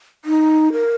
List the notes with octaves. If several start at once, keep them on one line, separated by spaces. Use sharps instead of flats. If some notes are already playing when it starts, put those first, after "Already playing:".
D#4
A#4